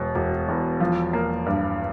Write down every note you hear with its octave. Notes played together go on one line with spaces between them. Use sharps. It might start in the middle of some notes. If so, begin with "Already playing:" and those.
Already playing: E1 B2
E1
E2
F3
A#3
G2